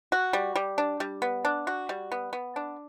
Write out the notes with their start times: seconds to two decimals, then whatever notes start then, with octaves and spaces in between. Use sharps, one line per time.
0.12 F#4
0.33 G3
0.56 G3
0.78 D4
1.00 G3
1.22 B3
1.45 D4
1.67 F#4
1.89 G3
2.12 B3
2.33 B3
2.56 D4